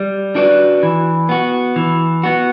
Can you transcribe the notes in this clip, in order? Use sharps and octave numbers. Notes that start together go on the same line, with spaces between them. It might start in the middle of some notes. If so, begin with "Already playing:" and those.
Already playing: G3
D4 F#4 B4 D5
E3
B3 F#4
E3
B3 F#4